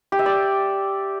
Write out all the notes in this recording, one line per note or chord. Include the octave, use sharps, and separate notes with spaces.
G4
E5
D5